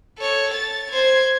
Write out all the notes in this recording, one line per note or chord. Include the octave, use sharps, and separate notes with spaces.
A4 C#5
A6
C5 G#6